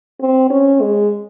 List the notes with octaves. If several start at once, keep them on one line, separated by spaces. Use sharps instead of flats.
C4
C#4
G#3